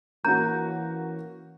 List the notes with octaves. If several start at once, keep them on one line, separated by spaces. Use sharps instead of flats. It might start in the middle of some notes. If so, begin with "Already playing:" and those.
E3 A#3 C#4 F#4 A#5 G6